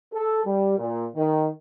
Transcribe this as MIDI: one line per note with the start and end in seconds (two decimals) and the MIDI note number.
0.13 0.40 69
0.45 0.76 55
0.78 1.06 46
1.15 1.47 51